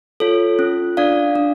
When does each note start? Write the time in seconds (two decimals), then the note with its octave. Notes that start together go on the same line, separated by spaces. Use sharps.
0.20 F4 A4 C#5
0.59 C#4
0.97 D4 D5 F5
1.35 D4